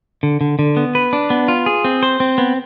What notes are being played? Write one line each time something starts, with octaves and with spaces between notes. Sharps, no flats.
D3
D3
D3
B3
B4
D4
B3
F4
G#4
C4
C5
C4
B3